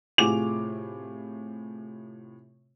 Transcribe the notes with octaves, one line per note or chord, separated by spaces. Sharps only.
A2 C3 F4 G#4 D6 F7